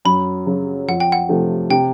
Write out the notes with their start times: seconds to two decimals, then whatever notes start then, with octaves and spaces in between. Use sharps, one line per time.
0.05 F#2 B5
0.46 C#3 F#3
0.88 F2 F#5
1.00 G5
1.12 F#5
1.29 C3 F3 A3
1.70 C3 G5